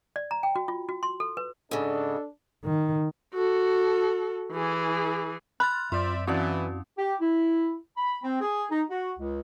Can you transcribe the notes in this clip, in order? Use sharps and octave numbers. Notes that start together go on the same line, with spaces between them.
D5
A#5
G5
F#4
F4
F#4
C6
A4
B4
G#2 C#3 D4 A4
D#3
F#4 A4
E3 G#4
B5 C6 F6 F#6 A6
F#2 C4 F4 D5 E5 C6 G6
E3 C4 C#4 E4 F#4 D5
G4
E4
B5
C4
G#4
D#4
F#4
C#2